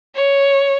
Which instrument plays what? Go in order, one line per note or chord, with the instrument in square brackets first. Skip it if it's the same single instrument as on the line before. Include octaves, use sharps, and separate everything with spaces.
[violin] C#5